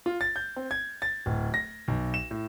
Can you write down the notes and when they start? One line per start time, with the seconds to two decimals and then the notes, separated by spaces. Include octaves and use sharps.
0.06 F4
0.21 A6
0.36 G6
0.56 C4
0.71 G#6
1.02 A6
1.26 D1
1.54 A#6
1.88 B1
2.14 E7
2.31 A2